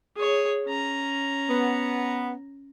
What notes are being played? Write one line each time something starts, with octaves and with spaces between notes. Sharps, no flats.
G#4 C#5
C#4 A#5
B3